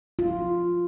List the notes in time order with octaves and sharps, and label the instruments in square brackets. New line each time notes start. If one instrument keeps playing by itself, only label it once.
[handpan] F4